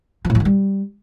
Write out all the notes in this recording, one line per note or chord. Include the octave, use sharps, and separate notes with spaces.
F3
A2
F3
D#3
G3